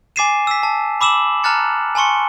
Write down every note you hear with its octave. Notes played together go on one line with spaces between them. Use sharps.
G#5 D6 A6 C7 D#7 E7
E6 B6
A5
B5 D6 E6 E7 F#7
A5 A#5 F6 F#6 A6 C#7
G#5 A5 C6 C#6 C#7